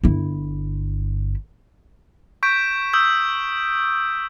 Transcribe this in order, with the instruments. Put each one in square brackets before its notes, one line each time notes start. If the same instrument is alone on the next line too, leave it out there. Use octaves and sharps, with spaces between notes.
[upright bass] G1 E4
[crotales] C#6 G6 B6 D7
D#6 E6 G6